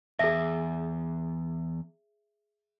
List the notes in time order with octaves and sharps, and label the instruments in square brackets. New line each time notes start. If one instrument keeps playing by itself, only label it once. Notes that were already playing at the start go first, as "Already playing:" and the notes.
[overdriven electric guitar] E2 [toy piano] G#4 E5